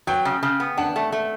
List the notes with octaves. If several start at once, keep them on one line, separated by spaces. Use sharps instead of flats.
F#3 G5
C#3
C#3
B3
D4 F#5
A3
A3